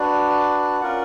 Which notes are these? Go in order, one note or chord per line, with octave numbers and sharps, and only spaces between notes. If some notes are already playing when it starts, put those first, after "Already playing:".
Already playing: D4 F#4 B4 D5
C#4 F4 A#4 D5 F#5